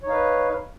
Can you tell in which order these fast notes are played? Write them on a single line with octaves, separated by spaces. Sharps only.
C#5 D#4 F5 B4